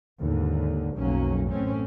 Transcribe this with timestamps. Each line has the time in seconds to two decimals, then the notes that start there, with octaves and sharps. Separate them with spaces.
0.21 D#2 G#2 D3
0.96 B1 F2 F#3 A#3 C#4
1.47 A1 F#2 A3 C4 C#4